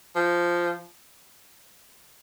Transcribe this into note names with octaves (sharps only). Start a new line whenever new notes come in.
F3